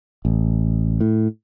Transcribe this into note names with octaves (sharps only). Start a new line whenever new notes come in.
A1
A2